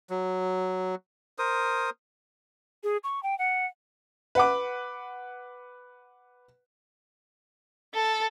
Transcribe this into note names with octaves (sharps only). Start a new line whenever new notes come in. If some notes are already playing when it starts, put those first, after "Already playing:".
F#3
A#4 C5 D#6
G#4
C#6
G5
F#5
B4 F#5 D6
A4